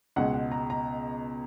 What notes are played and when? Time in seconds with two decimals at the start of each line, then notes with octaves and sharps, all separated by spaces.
0.16 C#2 B2 G#3 F#5
0.34 F#5
0.52 A#5
0.70 A#5